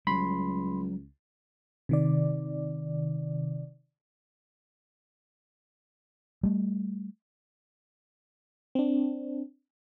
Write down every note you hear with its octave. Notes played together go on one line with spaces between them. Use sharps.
C#2 F#3 G3 B5 C6
C3 D#3 D5
G3 A3
C4 D4